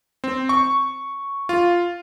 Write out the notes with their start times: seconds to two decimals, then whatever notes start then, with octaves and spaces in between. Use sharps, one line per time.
0.24 C4
0.49 C#6
1.49 F4